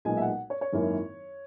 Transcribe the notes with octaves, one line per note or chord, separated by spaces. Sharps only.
B1 A#2 G#3 D#4 G#5
E5
F#5
C#5
C#5
G#1 F#2 D#3 A#3 E4